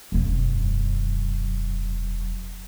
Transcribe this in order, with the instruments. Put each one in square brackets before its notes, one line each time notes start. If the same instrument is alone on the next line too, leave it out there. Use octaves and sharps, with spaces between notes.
[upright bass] E1 F#2